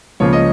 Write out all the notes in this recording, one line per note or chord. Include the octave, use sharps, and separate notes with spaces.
C#2 C#3 F3 A#3 C#5
D#5